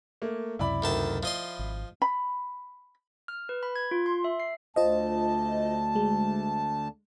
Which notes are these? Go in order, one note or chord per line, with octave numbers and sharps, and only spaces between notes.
A3 A#3
C#2 F#2 C3 E4 D5 B5
D2 D#3 A5
F3 D#5 C6
G#1
B5
F6
B4
B5
G#6
F4
C6
E5
C7
D2 F4 C5 D#5 A5
G#3